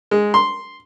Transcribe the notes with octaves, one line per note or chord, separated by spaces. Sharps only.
G#3
C6